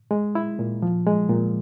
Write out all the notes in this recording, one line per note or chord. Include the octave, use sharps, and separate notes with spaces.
G#3
E4
A#2
F3
G#3
A#2